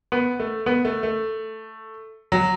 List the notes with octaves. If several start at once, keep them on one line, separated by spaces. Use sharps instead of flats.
B3
A3
B3
A3
A3
F#3